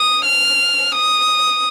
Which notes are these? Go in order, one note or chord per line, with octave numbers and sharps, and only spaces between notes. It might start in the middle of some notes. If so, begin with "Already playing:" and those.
Already playing: D#6
F6
D#6